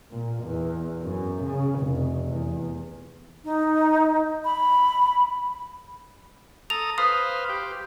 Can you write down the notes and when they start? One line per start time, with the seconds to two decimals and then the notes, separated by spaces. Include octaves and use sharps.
0.12 A#2
0.44 E2
1.02 F#2
1.43 C#3
1.80 F1
2.29 E2
3.44 D#4
4.45 B5
6.70 A4 A#5 D#6 F7
6.98 B4 C5 F5 D#6
7.49 G4